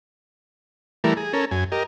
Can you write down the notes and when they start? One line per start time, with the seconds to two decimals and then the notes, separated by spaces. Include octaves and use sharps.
1.04 E3 G3 A3 A#4
1.17 G#4
1.33 C#4 A4 A#4
1.51 F#2 G#5
1.72 G4 A#4 D#5